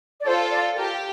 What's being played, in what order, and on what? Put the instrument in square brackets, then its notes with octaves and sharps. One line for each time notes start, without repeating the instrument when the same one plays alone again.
[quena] D5
[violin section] F4 A4 [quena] C5
[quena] D5
[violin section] G4 [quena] A#4